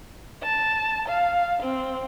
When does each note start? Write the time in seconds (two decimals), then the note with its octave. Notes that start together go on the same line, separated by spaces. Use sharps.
0.42 A5
1.07 F5
1.62 C4